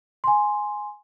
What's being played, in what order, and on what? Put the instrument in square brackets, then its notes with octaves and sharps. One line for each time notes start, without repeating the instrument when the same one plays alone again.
[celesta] G#5 C6